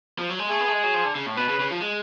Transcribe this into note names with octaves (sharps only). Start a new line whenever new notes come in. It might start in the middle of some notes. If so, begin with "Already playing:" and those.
F3
F#3
G#3
A3 G#4
B3
A3
G#3
F#3
F3
D3
C#3
A2
B2 B4
C#3
C#3
F3
G#3